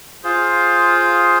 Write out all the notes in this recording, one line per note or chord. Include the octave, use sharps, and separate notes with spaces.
F4 G#4 C5 F5